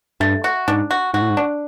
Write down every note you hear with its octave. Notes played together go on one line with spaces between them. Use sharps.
G2 A3
F#4
G#2 D4
F#4
G#2 F#4
A2
G#2
D4